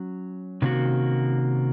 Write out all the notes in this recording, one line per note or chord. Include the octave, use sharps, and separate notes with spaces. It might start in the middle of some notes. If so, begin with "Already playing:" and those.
Already playing: F#3 C#4
C3 D#3 A#3 C#4 F#4